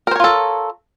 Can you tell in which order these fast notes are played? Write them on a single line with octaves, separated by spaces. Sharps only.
A#4 C5 C#5 F4 A4